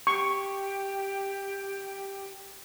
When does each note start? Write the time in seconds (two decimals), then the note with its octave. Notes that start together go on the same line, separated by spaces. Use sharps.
0.07 G4 C#6